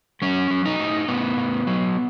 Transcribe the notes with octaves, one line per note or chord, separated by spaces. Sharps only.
F#3 C#4
F#3
D#4
A2
A2 B3
A2
F#3